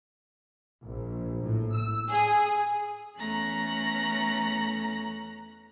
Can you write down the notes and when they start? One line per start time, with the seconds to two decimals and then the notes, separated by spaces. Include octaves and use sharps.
0.84 A#1
1.43 A2
1.75 E6
2.11 G#4
3.16 E2 A3 C#4 A#5 F#6 A#6